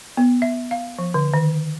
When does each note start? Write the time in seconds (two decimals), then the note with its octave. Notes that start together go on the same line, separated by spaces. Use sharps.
0.17 B3
0.42 E5
0.71 F5
0.98 F3
1.14 D3
1.34 D#3